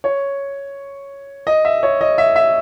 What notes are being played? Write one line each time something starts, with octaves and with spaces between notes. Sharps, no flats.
C#5
D#5
E5
C#5
D#5
E5
E5